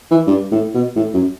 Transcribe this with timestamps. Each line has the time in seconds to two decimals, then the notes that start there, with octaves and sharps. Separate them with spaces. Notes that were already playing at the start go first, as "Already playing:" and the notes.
0.11 E3
0.27 G2
0.51 A2
0.74 B2
0.96 A2
1.14 F#2